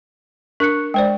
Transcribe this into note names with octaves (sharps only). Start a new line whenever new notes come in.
D4 A#4 C#6 F#6 C#7
G#3 C5 D5 G5